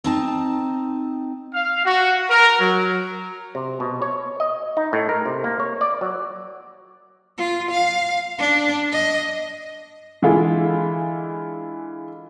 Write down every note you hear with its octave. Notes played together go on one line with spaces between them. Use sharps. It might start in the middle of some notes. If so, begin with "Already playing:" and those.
C4 D#4 A5
F5
F#4
A#4
F#3
C3
B2
C#5
D#5
D#4
A2
A#4
C3
A#3
C#5
D5
F#3
F4
F5
D4
D#5
D3 E3 G#3 E4 F4